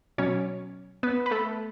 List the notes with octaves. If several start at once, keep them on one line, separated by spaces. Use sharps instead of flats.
B2 F#3 C#4 C#5
B3 B4
B4
A3 A4